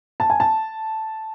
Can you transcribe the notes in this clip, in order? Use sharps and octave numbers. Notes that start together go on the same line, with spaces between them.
A5
G#5
A5